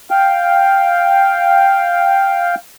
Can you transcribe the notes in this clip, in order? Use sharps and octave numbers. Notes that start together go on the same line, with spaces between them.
F5 G5